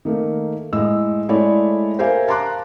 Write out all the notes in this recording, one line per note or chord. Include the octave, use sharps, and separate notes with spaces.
D#3 A3 A#3
A2 G#3 D#5 E6
G#3 A3 E4 C#5 D5
G4 A#4 C5 E5 F5 G#5
F5 A5 A#5 C6 D6 F#6